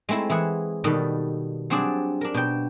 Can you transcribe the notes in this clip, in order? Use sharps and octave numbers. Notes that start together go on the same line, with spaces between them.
G#3 A3 C4 E4
E3 E4 G#4 F#5
B2 D#3 G3 A4 B4
F#3 G3 C4 D4 G#4 D5
D4 A#4
B2 G5